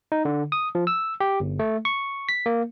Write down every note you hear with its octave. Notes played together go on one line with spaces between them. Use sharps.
D#4
D3
D#6
F3
E6
G4
G1
A3
C#6
B6
A#3